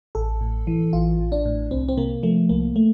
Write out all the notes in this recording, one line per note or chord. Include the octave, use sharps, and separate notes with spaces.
A1 A4
A2
E3
A1 F4
A1
D4
A2
C2 C4
C4
C3 A#3
F3 A3
C2 A#3
A3